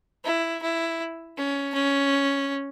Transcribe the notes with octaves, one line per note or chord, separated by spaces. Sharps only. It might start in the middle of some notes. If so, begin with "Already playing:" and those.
E4
E4
C#4
C#4